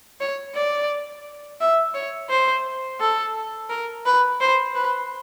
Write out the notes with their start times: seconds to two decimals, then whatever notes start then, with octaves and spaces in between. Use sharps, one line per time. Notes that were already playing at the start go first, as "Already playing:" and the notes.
0.20 C#5
0.55 D5
1.60 E5
1.94 C#5
2.29 C5
3.00 A4
3.69 A#4
4.06 B4
4.40 C5
4.75 B4